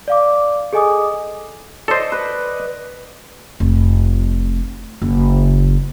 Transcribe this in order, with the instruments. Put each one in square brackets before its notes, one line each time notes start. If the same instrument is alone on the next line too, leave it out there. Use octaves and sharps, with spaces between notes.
[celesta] D5 F5 D6
G#4 A4 D#5 G#5 D6 D#6
[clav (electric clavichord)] A4 C5 [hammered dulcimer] D5 D#5
[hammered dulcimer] B4
[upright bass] F1
F#1